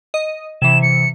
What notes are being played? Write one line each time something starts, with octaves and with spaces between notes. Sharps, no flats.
D#5
C3 E3 E7
C#7